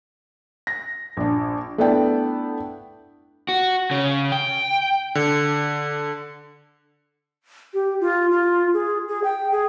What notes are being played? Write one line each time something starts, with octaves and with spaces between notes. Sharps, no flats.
A#6
A#1 D4
A3 B3 D4 E4 D5 G5
F#4
C#3
G5
D3
G4
F4
F4
G#4
G#4
G5
G#4